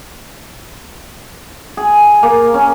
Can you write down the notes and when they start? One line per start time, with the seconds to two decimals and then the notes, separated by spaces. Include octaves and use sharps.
1.77 G#4
2.23 A#3
2.54 C#4